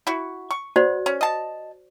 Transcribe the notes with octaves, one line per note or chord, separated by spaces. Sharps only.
E4 F#4
C#6
B3 F#4 C5 D5
C#4
D#5 A5